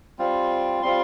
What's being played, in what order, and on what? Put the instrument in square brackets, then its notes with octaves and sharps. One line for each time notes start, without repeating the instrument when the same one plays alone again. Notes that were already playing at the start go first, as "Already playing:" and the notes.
[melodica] G3 C4 F4
G3 C4 F4 C6